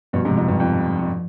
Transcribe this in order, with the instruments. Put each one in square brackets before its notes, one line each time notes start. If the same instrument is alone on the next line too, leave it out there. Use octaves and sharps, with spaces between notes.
[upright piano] G2 B2 [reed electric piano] F3
[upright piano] G#2 C3
[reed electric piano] F3
[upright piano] F2 G#2
[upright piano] G2 [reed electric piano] F3
[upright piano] F2 [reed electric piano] F3
[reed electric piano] G2
F3
[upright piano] F2